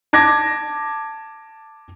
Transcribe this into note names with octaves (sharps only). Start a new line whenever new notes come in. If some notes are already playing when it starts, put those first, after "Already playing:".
A5 D6 G#6 A#6